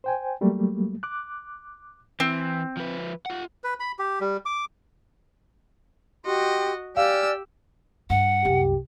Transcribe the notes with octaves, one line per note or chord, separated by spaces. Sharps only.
C5 G5 G#5
F#3 G3 A3 A#3
D6 F#6
E3 C4
F3 B4
F4 F#5
B4
B5
G4
G3
D6
F#4 G4 D#5 C6
G4 D5 F5 G#5 E6 F6
G2 F#5
C2 F#2 G4